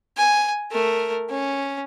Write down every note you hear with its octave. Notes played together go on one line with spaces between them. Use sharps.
G#5
A3 A#4
C#4